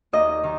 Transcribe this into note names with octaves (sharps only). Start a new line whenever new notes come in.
D#2 D#5
D#3